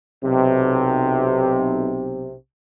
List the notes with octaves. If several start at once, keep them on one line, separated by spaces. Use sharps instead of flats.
B1 C3